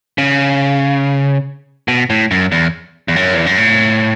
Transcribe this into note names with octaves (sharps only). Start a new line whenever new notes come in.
C#3
B2
A2
F#2
E2
E2
F#2
E2
F#2
A2